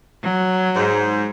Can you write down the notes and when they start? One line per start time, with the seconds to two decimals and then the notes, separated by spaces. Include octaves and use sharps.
0.23 F#3
0.76 G#2